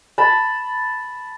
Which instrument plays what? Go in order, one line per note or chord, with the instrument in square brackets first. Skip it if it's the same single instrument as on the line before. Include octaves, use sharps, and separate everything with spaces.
[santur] A5 B5